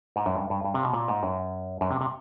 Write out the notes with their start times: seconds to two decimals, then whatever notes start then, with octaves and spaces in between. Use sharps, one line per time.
0.16 G#2
0.26 F#2
0.35 G2
0.50 G2
0.65 G2
0.74 C3
0.83 B2
0.93 A#2
1.08 G#2
1.23 F#2
1.81 F#2
1.91 C3
2.01 C3